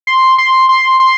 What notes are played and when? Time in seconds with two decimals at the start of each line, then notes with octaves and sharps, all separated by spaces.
0.07 C6
0.38 C6
0.69 C6
1.00 C6